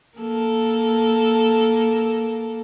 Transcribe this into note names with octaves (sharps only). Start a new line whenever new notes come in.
A#3 A4